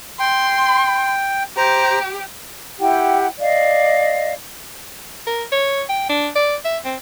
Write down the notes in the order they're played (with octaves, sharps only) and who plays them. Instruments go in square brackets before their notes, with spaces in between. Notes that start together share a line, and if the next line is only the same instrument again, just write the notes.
[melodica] G5 [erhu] C6
[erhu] G4 [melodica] C5 A#5
[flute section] E4 G4 F#5 G5
D5 D#5 F5
[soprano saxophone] A#4
C#5
G5
D4
D5
E5
C4